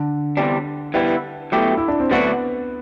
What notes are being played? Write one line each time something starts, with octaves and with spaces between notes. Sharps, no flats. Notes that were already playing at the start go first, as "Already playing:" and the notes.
Already playing: D3
E2 C3 G3 D4
E3 G3 B3 E4
B2 F#3 A3 E4 G4
E4
D4
C4
D3 F#3 A3 B3 D4 F#4